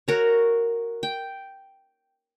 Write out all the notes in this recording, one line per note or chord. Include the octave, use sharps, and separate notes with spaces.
F#4 A#4 C#5
G5